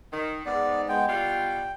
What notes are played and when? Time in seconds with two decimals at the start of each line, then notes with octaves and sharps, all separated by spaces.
0.13 D#3
0.46 G#2 B3 D5
0.88 G#3 B3 G5
1.09 B2 G3 F4 G5